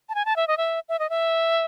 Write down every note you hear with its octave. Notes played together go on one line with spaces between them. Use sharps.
A5
G#5
A5
E5
D#5
E5
E5
D#5
E5